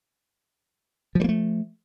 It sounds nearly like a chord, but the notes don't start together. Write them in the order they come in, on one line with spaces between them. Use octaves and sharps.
F3 G3 A#3 A3